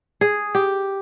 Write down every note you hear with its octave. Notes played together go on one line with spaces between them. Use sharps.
G#4
G4